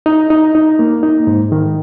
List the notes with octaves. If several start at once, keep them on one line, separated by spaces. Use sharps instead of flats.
D#4
D#4
D#4
A#3
D#4
G#2
D#3